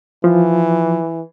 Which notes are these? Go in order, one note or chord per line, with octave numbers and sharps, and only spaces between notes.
E3 F3